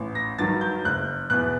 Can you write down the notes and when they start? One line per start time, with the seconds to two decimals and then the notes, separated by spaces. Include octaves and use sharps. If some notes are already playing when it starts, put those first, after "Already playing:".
Already playing: A1
0.15 A#6
0.38 G2 D#3 F#3 A6
0.61 G6
0.85 F#1 F#6
1.30 E2 B2 F#6